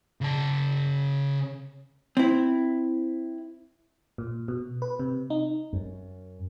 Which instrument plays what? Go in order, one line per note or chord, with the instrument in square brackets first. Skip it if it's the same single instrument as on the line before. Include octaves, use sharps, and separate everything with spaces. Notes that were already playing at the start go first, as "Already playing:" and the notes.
[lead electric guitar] C#3 A5
[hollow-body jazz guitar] C4 E4
[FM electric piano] A#2
B2
B4
C3
D#4
[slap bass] F#2